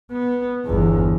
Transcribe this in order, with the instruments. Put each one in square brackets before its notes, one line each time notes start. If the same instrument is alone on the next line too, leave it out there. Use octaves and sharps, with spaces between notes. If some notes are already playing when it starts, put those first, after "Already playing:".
[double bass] B3
G1 E2